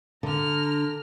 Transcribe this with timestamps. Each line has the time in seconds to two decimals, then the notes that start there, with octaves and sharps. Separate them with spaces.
0.23 D3 A#5 F6